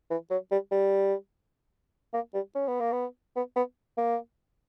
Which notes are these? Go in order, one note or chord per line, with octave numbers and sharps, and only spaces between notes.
E3
F#3
G3
G3
A#3
G3
C#4
B3
A#3
B3
B3
B3
A#3